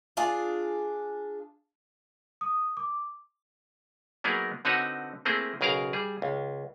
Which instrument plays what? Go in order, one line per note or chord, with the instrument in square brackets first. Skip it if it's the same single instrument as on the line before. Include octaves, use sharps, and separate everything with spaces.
[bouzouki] D4 F4 G#4
[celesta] D#6
D6
[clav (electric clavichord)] F#3 A#3 B3 D#4 G#4 A#4
D3 C4 D#4 F#4 B4 C#5
A3 A#3 C4 E4 G#4
B1 C#3 G#4 A#4 F5 A#5
G3 G#4
C#2